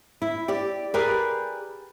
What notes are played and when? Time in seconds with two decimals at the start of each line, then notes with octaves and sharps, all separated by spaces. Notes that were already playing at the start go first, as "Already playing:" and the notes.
0.22 E4
0.48 G4 D5
0.94 G4 G#4 A#4 B4 D5